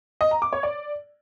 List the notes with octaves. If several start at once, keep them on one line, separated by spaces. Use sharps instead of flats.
D#5
A#5
D6
C#5
D5